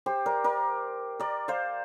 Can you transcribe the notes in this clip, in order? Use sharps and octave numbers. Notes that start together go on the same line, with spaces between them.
G4 C5
A#4 D5
A#4 D5
A#4 D5
C5 F5